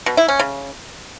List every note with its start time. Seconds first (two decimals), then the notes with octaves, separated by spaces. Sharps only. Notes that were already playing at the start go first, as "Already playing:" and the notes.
0.06 B2
0.17 E4
0.28 C#4
0.39 C#3